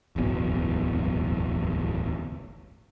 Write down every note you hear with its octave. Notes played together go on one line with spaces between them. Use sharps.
D1 G1 E2 B2